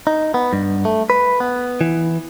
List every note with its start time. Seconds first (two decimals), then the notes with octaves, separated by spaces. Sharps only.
0.07 D#4
0.34 B3
0.53 G2
0.85 A3
1.10 B4
1.40 B3
1.81 E3